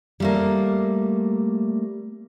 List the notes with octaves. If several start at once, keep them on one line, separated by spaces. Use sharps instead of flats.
G3 A3 A#3